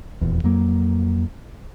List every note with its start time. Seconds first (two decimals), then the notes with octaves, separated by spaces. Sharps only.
0.21 D#1 E2
0.44 F2 F#3 A#3